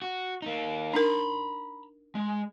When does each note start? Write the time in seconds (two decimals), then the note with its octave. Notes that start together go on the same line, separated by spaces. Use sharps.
0.02 F#4
0.42 A#3 D#4
0.94 D4 D#4 A#4 A#5 B5
2.15 G#3